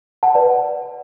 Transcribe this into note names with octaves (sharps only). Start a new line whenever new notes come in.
F#5 A5
B4 D5